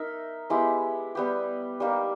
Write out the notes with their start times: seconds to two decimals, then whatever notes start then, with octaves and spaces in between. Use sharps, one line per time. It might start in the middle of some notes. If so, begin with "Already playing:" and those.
Already playing: D#4 A#4 E5
0.50 G#3 B3 E4 G4
1.15 G3 B3 G4
1.80 G3 A#3 D#4